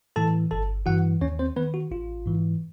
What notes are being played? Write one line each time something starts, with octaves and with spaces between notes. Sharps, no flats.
A2 E3 A4 A5
G1 A4 A5
G2 E3 F#4 F#5
D#2 C#4 C#5
C4 C5
D#3 B3 B4
F#4
A1 F4
G#2 E3